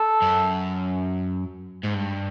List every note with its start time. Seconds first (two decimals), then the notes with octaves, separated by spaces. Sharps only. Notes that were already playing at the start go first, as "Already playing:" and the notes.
Already playing: A4
0.22 F#2
1.84 G#2
1.95 G2